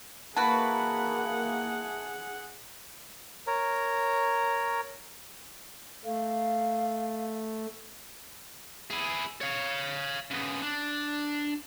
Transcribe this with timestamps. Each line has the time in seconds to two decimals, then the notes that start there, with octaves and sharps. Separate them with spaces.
0.37 A#3 E4 F#4 G#4 B4 F#5 A5
3.47 A#4 C#5 A#5
6.05 A3 F5
8.90 E4 G#4
9.41 C#5 F5
10.31 C#3 B3
10.62 D4